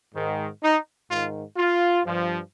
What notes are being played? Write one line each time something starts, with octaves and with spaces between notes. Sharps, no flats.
G#2 D#3
D#4
G#2 D#3 F4
F4
G2 F3